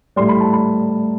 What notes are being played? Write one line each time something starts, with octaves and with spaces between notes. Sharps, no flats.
A2 G3 C6
B5
A5
B5